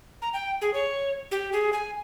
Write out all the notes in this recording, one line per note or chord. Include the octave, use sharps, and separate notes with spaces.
A#5
G5
G#4
C#5
G4
G#4
G#5